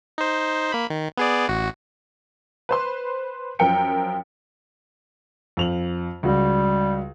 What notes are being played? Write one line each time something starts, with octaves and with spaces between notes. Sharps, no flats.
D#4 C5
A#3 B5
D#3
B3 G#4 D5
A1 F#4
B4 C5 C6
F#2 F3 A#4 G5 C#7
F2 F7 F#7
C#2 G3 F#4